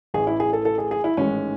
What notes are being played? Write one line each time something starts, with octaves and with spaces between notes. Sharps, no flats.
A1 A2 E3 G#4
E4
G#4
A4
A4
G#4
G#4
E4
A1 G#2 D#3 G#3 C#4